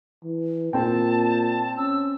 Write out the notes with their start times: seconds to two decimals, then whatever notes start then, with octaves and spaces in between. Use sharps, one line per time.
0.24 E3
0.73 A#2 C4 G5 A5
1.77 C#4 E6